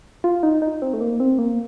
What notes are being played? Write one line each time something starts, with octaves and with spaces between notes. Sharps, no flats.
F4
D#4
D#4
C4
A3
A#3
C4
A#3